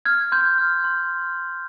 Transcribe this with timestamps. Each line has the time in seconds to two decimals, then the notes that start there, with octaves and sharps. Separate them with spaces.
0.05 F6 G#6
0.32 C6 G6
0.58 F6
0.84 C6